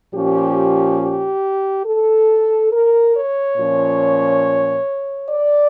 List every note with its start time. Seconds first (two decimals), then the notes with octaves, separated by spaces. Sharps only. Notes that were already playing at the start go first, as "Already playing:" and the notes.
0.13 A#2 F3 C#4 G4
1.00 G4
1.86 A4
2.72 A#4
3.15 C#5
3.57 A#2 F3 C#4
5.30 D5